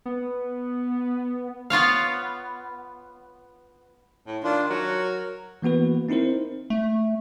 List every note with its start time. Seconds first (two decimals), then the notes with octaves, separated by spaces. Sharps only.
0.06 B3
1.70 B3 F4 C#5 F5
4.27 A2
4.44 D#3 D4 F4
4.70 F#3 A#4
5.62 E3 A#3 B3 F#4 B4
6.09 C4 D#4 E4 A#4 C5
6.70 A3